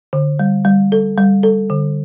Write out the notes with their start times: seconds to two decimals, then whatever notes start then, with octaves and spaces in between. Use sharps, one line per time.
0.13 D3
0.39 G3
0.65 G3
0.92 A4
1.18 G3
1.43 A4
1.70 D3